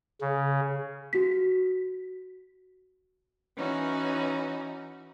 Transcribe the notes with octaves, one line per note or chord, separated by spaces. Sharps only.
C#3
F#4 B6
E3 C#4 D#4 F#4